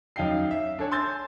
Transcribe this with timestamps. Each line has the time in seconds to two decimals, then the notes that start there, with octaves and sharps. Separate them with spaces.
0.16 F#2 D#4 F5 G5 C7
0.51 E5
0.79 D4 A4 C#5 G#5
0.91 G#5 C6 E6 G6 A6